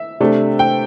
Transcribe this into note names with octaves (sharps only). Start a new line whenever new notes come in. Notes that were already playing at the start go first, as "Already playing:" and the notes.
Already playing: E5
C3 A3 D4
G5